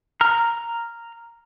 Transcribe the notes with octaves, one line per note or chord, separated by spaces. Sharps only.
A#5 F6